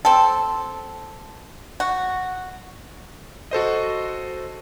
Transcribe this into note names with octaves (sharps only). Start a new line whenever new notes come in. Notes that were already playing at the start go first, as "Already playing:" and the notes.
C4 A4
F#4
F#4 A4 C5 D#5